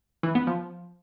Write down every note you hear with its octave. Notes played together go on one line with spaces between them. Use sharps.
E3
B3
F3